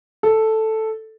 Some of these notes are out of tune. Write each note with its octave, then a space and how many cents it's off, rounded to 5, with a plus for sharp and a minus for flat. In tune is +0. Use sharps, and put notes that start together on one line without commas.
A4 +0